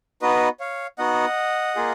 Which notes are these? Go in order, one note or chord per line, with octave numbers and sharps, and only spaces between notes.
B3 D#4 F#4 B4 D#5
C#5 F5
B3 D#4 F#4 D#5 F#5
A#3 F4 G#4